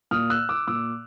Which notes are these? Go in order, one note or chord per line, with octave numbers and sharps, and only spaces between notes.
A#2 D#6 F6
E6 F#6
D6 E6
A#2 D6 E6